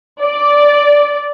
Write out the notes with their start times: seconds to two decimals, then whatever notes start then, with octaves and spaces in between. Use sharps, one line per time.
0.23 D5